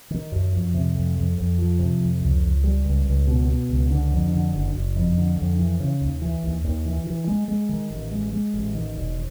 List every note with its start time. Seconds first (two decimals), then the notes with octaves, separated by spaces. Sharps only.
0.10 D#3
0.32 F#2
0.53 F2
0.74 C3
0.95 F2
1.16 F2
1.37 F2
1.58 F3
1.79 C3
2.01 F2
2.21 C#2
2.43 C#2
2.64 G3
2.85 C#2
3.06 C#2
3.27 B2
3.48 B2
3.69 C#2
3.90 D3
4.11 F2
4.32 D3
4.53 F#1
4.74 F#1
4.96 F2
5.17 D3
5.37 F2
5.58 E3
5.80 C#3
6.01 D#2
6.22 E3
6.43 D#2
6.64 D#2
6.85 E3
7.07 E3
7.28 G#3
7.48 G#3
7.69 D#3
7.90 A1
8.11 G#3
8.33 G#3
8.54 A1
8.75 D#3
8.96 E1